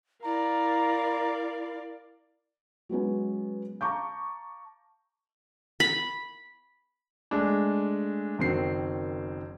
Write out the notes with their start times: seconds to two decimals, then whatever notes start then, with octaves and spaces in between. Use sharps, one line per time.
0.24 E4 A#4 D5 F5 A#5
2.89 F#3 G#3 B3 C#4
3.81 F5 A5 A#5 C#6 D6 G6
5.80 B5
7.31 G#3 A3 D4
8.39 F#1 D#3 C4 F#4 C7